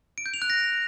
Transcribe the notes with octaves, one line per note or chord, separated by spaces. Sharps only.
D7
G6
F7
F#6
A#6